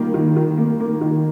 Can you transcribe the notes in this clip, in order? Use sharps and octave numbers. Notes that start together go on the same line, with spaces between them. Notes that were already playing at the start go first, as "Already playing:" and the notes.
Already playing: D#3 G3 A#3
D#3
D#3
A#3
A#3
D#3